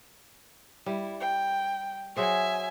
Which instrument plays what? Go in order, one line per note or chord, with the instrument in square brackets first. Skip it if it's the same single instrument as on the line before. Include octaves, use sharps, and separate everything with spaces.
[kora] G3 [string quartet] E4
[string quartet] G5
[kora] F#3 G#4 C5 [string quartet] E5 G#5